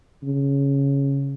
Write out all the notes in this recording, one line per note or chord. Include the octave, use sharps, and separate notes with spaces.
C#3